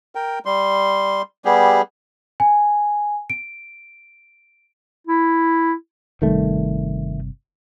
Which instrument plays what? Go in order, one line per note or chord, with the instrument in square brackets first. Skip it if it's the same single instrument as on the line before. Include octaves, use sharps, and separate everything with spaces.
[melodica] A#4 G5
G3 C6
G3 B3 G4 G#4
[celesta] G#5
D7
[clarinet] E4
[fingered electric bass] G1 C3 G3 [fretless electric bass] D#3 A3